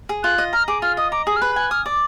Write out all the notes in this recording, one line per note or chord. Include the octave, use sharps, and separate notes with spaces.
G#4
F4 F#6
D#5
A#5 F6
G#4 D6
F4 F6
D#5 D#6
A#5 D6
G#4 D#6
F6
B4 F#6
G#5 F#6
D#6 F6
D5